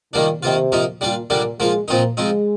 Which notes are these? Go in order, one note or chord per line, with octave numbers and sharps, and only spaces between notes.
A#2 D#3 G3 A#3 D4
C3 D#3 A#3 F4
F3 A#3 D#4
A#2 G3 D4 F4
A#2 D3 G3 A#3 D4
F3 G#3 A#3 F4
A#2 F3 A#3 C4 D#4
F3 G#3 C4 D#4